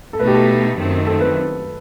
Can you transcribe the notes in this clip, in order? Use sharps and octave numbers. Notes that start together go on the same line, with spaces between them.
A4
B2 A3 D#4 B4
G4
A4
F#2 D#3 A3 C4
A4
B4